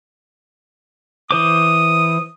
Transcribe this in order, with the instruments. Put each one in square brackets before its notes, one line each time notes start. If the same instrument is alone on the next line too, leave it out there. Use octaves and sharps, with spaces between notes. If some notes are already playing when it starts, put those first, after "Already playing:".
[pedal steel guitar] E3 C5 D6 [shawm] D#6